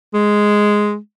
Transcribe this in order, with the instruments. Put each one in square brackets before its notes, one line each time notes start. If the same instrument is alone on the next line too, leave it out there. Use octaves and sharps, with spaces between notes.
[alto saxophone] G#3